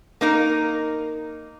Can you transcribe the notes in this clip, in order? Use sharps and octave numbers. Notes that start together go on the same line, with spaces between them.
A#3 D#4 A#4